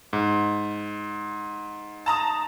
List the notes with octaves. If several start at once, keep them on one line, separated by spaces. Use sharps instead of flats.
G#2
A5 A#5 D#6